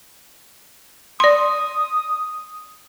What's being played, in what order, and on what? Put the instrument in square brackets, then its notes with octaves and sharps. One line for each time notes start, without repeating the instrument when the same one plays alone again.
[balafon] D5 C6 [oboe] D#6